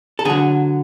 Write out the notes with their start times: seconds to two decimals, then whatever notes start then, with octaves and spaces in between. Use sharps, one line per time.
0.19 A4
0.25 D3 F#3 G#4